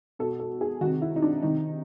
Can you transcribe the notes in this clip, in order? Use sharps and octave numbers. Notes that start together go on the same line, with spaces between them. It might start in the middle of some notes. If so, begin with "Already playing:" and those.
B2 A4
A4
G#4
C3 D#3 F#4
E4
D#4
D4
C3 D#3 D#4